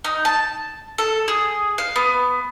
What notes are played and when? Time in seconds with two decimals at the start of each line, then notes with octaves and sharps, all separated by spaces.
0.04 D#4
0.25 A5
0.98 A4
1.28 G#4
1.78 F5
1.96 B3